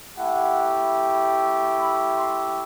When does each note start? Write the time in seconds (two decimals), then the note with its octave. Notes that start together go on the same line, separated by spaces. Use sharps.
0.18 A3 E4 G4 F#5
1.79 B5
2.18 C6